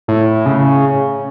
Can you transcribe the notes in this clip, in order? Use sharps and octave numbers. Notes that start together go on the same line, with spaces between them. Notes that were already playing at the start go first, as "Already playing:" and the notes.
A2
C#3